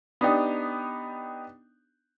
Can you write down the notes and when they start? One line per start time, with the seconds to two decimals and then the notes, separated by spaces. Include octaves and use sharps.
0.21 B3 D4 D#4 G4